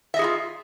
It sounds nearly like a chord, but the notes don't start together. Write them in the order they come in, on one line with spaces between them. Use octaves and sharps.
E5 D#5 G#4 F#4 F4